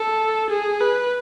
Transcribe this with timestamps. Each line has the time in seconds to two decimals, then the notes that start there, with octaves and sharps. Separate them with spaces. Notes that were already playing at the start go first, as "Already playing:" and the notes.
Already playing: A4
0.50 G#4
0.81 B4